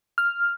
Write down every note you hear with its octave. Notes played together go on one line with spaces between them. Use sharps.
F6